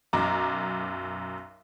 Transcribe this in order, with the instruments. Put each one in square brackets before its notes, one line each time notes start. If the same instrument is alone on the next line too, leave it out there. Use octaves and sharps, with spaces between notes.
[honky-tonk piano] B1 F#2 A#5 D6